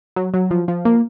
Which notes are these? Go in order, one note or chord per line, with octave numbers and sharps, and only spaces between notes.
F#3
F#3
F3
F3
A#3